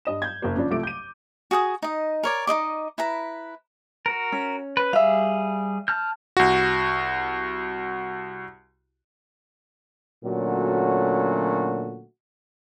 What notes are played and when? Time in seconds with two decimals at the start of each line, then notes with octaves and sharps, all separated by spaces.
0.05 G2 D#5 E7
0.22 G6 G#6
0.42 F#1 A#3
0.56 C#3 F3 D4
0.70 C2 F3 A3 D6 D7
0.83 G6 D#7
1.51 F#4 G#4 F#5 D#6
1.82 D#4 D#5
2.23 A#4 C#5 D5
2.47 D#4 C5 D#5 D6
2.98 E4 B4 A#5
4.06 F#4 A#4
4.32 C#4
4.77 B4
4.93 G3 G#4 E5 F5
5.88 A5 F6 G6
6.37 C2 F#4
10.24 A#2 D3 F#3 A3 C#4 F#4